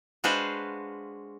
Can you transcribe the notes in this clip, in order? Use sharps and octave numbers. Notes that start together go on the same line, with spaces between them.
G#3 D4 F#4 B4 C5 F5